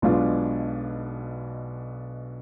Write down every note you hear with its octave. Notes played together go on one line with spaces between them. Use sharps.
B1 B2 G#3 D4 F4